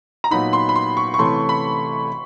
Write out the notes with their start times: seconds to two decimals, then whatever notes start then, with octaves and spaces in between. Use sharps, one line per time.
0.24 A#5
0.31 A#2 F#3 B3 D#4 B5
0.53 C6
0.69 B5
0.76 C6
0.97 C#6
1.14 C#6
1.19 C3 E3 A3 C#4 C6
1.49 B5